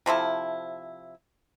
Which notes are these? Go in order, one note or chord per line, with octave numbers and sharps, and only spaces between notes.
C3 F3 E4 A4